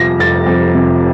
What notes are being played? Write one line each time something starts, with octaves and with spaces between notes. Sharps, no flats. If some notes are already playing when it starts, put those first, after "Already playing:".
Already playing: F2 C3 F3 A#6
F1 A6
F2
C3